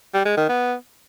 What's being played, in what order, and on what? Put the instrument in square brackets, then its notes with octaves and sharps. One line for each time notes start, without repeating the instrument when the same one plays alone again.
[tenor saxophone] G3
G#3
D#3
B3